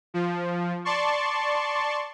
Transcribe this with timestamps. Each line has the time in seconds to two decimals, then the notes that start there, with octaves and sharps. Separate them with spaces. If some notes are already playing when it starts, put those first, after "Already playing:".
0.14 F3
0.85 D5 A5 C6 C#6